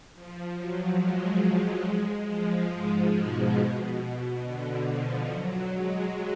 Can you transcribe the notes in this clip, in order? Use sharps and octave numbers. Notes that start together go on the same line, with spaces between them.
F3
F#3
G#3
G#3
G#3
F3
G#2
B2
D3
F3
F#3
G#3